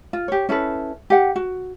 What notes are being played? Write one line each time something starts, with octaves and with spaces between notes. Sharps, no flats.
F4
G4 C#5
C#4 E4 A4 B4
G4 F#5
F#4